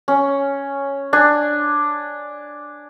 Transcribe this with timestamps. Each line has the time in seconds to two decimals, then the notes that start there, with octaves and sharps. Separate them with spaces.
0.08 C#4
1.13 D4 G#5